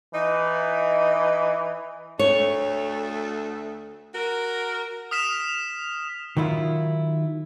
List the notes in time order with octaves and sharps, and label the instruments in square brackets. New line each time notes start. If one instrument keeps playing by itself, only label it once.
[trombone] E3 [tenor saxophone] D#4
[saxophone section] D2 A3 A4 [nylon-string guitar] C#5
[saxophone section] F#4 A#4
[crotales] D#6 F6 B6 E7 F7
[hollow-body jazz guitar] D#3 F#3 E4 F4